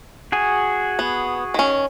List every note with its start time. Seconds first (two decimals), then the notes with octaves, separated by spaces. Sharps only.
0.32 F#4 G#4 G#5
0.99 B3
1.54 D#3 C#4